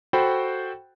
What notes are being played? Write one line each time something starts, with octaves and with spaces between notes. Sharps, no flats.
F#4 A4 C5 G5 B5